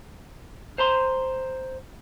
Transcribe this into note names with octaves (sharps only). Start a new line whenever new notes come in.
C5 A#5 C6